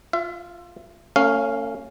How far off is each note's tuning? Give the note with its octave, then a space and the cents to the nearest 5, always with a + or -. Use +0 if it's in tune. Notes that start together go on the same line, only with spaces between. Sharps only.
F4 +0 E5 +35
A3 +45 C#4 +0 F5 +0